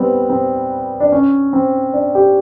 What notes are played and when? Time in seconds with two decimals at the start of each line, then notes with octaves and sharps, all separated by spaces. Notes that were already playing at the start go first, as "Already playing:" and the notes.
Already playing: G3 B3 C4
0.30 C4
1.00 D4
1.12 C#4
1.53 C4
1.93 D4
2.15 G4